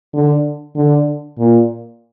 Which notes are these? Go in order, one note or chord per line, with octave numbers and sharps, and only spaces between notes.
D3
D3
A#2